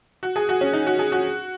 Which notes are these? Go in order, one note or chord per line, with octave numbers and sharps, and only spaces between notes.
F#4
G#4
F#4
C#4
D#4
F#4
G#4
F#4